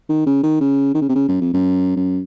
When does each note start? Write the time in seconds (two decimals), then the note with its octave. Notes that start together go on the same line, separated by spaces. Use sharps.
0.09 D#3
0.26 C#3
0.43 D#3
0.60 C#3
0.95 D#3
1.01 C#3
1.09 C3
1.15 C#3
1.28 F#2
1.41 F2
1.53 F#2
1.96 F#2